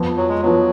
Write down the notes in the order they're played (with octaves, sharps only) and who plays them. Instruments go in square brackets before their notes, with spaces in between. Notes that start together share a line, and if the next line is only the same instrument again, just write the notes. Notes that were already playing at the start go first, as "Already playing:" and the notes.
Already playing: [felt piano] F2 F3 B3
[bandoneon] F#3
G#3
[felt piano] F3 B3 [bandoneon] F#3